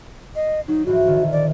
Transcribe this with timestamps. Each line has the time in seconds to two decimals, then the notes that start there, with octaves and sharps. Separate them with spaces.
0.36 D#5 C7
0.68 F#3 D#4
0.86 G#2 E3 F3 F#4
1.07 A#1 D3 D#3
1.32 D5